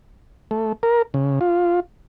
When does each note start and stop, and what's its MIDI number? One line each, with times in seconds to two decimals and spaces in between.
0.51 0.73 57
0.83 1.02 70
1.14 1.39 49
1.41 1.80 65